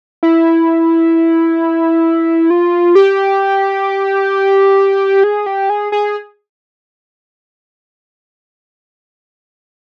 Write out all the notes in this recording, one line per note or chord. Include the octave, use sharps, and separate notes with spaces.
E4
F4
G4
G#4
G4
G#4
G#4